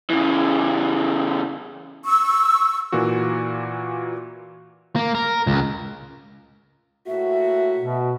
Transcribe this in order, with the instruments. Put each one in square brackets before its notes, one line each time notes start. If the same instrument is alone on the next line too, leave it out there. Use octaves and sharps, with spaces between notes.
[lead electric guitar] C#3 E3
[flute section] C#6 E6
[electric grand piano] A#2 E3 A#3 F#4
[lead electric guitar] A#3
A#4
C#2
[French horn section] A2 A#3 F#4 [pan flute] E5
[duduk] B2